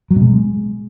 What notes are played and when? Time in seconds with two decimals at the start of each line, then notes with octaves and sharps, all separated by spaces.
0.11 F#3
0.16 B2
0.22 G#3